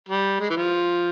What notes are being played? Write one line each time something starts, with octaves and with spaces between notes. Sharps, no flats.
G3
G#3
E3
F3